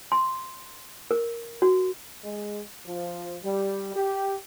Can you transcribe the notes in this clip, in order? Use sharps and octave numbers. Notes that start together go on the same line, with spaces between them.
C6
A#4
F#4
G#3
F3
G3
G4